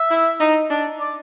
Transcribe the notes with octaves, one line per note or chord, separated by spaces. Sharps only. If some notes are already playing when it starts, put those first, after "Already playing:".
Already playing: E5
E4
D#4
D4
D5